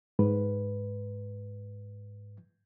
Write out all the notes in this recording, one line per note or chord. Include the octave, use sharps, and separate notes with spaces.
G#2 B4